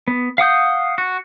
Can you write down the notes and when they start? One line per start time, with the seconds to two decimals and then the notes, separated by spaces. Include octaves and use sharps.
0.08 B3
0.38 F5 F#5 D#6 G6
0.98 F#4